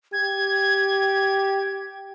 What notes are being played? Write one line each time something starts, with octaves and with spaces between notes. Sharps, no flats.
G4 G#6